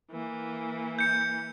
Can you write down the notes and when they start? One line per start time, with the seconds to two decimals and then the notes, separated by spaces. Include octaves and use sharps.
0.11 E3 A#3
0.99 G6 C#7